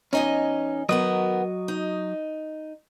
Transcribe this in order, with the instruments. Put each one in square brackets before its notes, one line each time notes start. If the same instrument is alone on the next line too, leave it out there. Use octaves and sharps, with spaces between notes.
[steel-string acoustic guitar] E2 D#5 G#5 [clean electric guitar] C#4 D#4
[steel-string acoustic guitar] D#3 B3 A#4 [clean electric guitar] F#3 F#4 D#5
[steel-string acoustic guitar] D#4